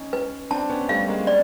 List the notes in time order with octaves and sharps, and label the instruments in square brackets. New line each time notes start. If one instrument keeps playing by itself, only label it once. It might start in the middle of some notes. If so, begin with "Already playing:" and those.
Already playing: [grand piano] C#4 D#4
[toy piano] B4
[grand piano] C4 D4 [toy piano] A5
[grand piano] B3 C#4
[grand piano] G3 A3 [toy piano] F5
[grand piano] G#3 A#3
[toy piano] D5